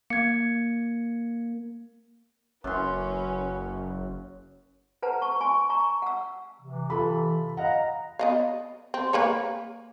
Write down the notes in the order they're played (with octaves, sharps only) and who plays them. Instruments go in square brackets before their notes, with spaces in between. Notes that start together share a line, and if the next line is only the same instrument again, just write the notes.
[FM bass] A#3 [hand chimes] G#6 C#7
[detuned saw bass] F#1 [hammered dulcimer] F#2 C6 [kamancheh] C#4 B4
[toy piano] A4 B4 C5 F#5 A5 A#5
A5 C#6
G#5 A5 C6 C#6
A5 A#5 C#6
F#5 E6
[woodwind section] C3 E3
[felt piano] F4 A4 B5
[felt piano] D#5 F5 F#5 [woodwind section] A#5
[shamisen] B3 D#5 F5
C4
A#3 B4 C#5